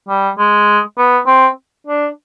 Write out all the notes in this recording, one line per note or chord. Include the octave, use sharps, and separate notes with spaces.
G3
G#3
B3
C4
D4